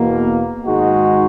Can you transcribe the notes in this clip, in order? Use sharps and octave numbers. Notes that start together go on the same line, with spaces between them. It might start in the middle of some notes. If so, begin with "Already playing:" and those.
Already playing: E2 B2 A#3
G#2 D#3 G#3 D#4 F#4